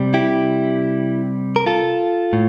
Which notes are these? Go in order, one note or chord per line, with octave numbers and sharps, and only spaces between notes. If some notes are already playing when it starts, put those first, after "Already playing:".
Already playing: C3 G3
E4 G4
A#4
F4 A4
A2